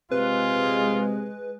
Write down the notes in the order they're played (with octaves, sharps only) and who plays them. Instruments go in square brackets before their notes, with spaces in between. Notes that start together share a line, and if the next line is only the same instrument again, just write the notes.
[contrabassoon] C3 [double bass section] G#3 [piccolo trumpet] F4 [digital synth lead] B4